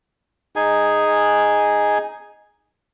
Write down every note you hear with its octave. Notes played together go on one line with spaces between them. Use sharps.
D#4 G#4 G#5